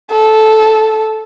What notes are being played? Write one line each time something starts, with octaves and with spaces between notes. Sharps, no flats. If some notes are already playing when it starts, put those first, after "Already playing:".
A4